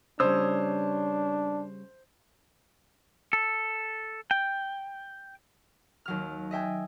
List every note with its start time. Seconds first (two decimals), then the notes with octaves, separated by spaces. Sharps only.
0.20 C#3 G3 D4 C5 C#5 D#6 E6
3.33 A4
4.31 G5
6.05 D#2 F#3 F6
6.51 D#5 E5 G5 G#5